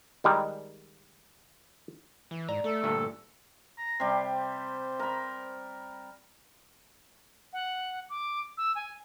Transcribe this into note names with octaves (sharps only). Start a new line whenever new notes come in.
D#3 G3 G#3
E3
G#2 D5 A#5
A3 A4
D2 G2 A#2
A#5
C3 G3 C6
C5
A#4 B5
F#5
D6
E6
G#5